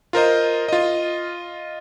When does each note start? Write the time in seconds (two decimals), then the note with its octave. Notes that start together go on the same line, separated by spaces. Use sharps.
0.13 F4 A#4 C5 D#5
0.69 F4 D#5